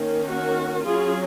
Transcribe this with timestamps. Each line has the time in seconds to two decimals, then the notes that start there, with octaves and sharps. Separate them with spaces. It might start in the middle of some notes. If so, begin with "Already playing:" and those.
Already playing: D#3 A#3 C#4
0.27 F#4 A#4
0.85 F#3 C#4 F4 G#4